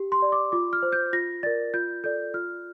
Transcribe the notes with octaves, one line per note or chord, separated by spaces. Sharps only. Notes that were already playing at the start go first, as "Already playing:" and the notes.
Already playing: G4
C6
D5
D6
F4 D6
F6
C5
G6
F4 A#6
A#4 D5 A6
F4 G6
A4 D5 G6
F4 F6